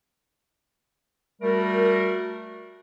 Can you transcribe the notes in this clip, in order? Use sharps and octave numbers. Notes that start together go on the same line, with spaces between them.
G3 A3 F#4 A#4